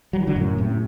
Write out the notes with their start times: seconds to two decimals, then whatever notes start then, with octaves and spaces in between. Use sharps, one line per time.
0.13 F#3
0.21 E3
0.27 D3 F#3
0.36 F#2 A2
0.58 A2 C3